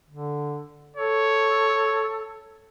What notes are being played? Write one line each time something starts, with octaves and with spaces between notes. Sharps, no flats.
D3
A4 C#5